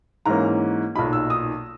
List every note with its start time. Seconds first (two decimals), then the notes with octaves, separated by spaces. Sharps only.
0.26 G#2 E3 A#3 C#4 A#5
0.95 B1 A#2 A#3 D#4 B5
1.13 E6
1.30 D#6